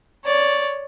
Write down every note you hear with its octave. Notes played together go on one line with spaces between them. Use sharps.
C#5 D5